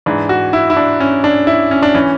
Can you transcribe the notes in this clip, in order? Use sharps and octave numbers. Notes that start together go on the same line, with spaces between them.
G#2 E3 D4
F#4
E4
E4
D4
C#4
D4
E4
C#4
D4
E3 C#4